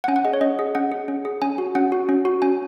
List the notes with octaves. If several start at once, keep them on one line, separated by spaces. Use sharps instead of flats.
F#5
C#4 G#5
F#5
G#4 D#5
C#5
C#4 D#5
G#4
C#4 F#5
G#4
C#4
G#4
C#4 G#5
F#4
C#4 F#5
F#4
C#4
F#4
C#4 G#5